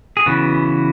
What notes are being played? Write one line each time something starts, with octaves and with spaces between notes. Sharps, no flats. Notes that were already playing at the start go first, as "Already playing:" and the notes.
G#4
C#3 E3 B3 F#4